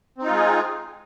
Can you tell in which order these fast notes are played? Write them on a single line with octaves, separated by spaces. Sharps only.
C4 D#4 F4 G#3 G#4